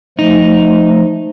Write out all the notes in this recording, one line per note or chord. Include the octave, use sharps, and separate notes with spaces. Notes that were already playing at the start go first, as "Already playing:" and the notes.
F3 A3 D#4